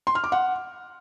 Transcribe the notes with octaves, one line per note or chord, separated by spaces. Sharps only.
C6
F6
D6
F#5